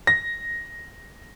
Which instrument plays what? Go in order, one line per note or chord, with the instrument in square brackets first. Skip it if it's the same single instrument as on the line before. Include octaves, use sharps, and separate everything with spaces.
[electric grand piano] A#6